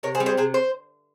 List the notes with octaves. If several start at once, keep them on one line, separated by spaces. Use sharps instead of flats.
C3 A#4 C#5
G#4 C5
G3 C4
G#4 C5
C3 G#4 C5
C5